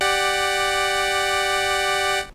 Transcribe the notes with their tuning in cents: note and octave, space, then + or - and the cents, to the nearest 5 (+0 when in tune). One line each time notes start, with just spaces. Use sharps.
G4 +0 D5 +10 F#5 +10